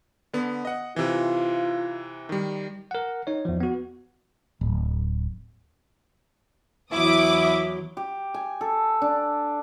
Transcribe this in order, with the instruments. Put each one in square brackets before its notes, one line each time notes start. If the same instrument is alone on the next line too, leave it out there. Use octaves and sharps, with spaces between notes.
[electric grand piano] D3 B3
D#5 F#5
[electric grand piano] C3 E3 [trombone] F4
[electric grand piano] D#3 G3
[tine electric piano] A#4 F#5
D#4 C#5
E2 F3
B3 F#4
[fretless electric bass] D1
[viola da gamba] E2 F#3 [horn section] E4 [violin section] D6 D#6
[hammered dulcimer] G4
G#5
A4
D4